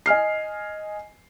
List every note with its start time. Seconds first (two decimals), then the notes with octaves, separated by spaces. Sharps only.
0.06 D#5 G#5 F6 C7